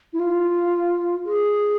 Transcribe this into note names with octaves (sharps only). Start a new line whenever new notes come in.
E4
F4
G#4